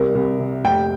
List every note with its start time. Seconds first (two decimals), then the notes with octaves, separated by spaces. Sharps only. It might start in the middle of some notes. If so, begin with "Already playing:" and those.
Already playing: C2 A#4
0.15 C2
0.39 C3
0.64 F1 G5